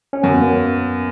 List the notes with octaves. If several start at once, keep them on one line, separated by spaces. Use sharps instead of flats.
C#4
F#2 B3
A#3